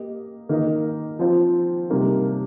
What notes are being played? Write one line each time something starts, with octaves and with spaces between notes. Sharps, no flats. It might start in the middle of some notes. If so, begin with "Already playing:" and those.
Already playing: A#3 G4 D#5
D#3 A#3 D#4 A#4 D#5
F3 C4 F4 C5
C3 G3 A#3 D#4 A#4